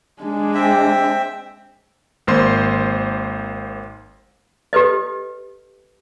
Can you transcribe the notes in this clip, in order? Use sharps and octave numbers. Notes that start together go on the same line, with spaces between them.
G#3 D4
C4 E5 G5
G#1 A#3 C5 C6
G4 A4 B4 D#5